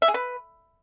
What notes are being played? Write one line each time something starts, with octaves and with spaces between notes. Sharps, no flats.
E5
G#4
B4